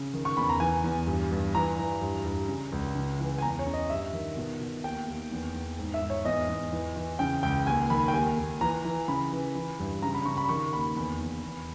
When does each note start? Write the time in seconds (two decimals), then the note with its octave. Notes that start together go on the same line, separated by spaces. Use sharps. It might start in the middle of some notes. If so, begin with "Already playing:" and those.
Already playing: C#3
0.13 D#3
0.25 C#6
0.37 E2 B5
0.49 A#5
0.60 E3 G#5
0.84 E2
1.07 G2
1.31 G2
1.55 E3 A#5
1.78 E3
2.01 G2
2.24 G2
2.48 C#3
2.72 C#2
2.95 C#3
3.20 E3
3.38 G#5
3.42 E2 A#5
3.59 C#5
3.66 C#3
3.74 D#5
3.90 G2 E5
4.13 D#3
4.37 B2
4.60 B2
4.84 D#2 G5
5.08 D#2
5.32 E2
5.55 E2
5.79 G#2
5.94 E5
6.01 G#2
6.10 C#5
6.25 E2 D#5
6.49 E2
6.72 E3
6.96 E3
7.19 C#3 G5
7.43 C#2 G5
7.66 D#2 G#5
7.90 D#3 B5
8.08 G5
8.14 D#2 G#5
8.38 D#2
8.61 E3 A#5
8.85 E3
9.08 C#3 B5
9.32 E3
9.55 E3
9.79 G2
10.02 C#3 A#5
10.14 B5
10.25 C#3 C#6
10.37 B5
10.49 D#3 C#6
10.73 D#2 B5
10.97 E2 B5
11.20 E2
11.43 E2